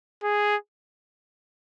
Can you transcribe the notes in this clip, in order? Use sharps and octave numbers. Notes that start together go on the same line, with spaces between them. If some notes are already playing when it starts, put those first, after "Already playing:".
G#4